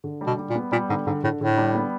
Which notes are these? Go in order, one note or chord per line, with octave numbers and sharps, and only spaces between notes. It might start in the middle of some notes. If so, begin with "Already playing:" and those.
D3
G3
B2
G3
A#2
B3
A#2 G3
G#2 D3
G#2 D3
A2 D3
A2 D3
G3
B3